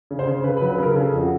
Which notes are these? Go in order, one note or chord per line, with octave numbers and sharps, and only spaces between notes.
C#3
C5
C#3
C#3 B4
B4
F#3
B4
C#3 A#4
C#3 A4
F2
F#4